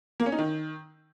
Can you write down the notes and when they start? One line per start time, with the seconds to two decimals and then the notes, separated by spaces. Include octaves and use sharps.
0.20 A#3
0.26 C#4
0.32 D#4
0.39 D#3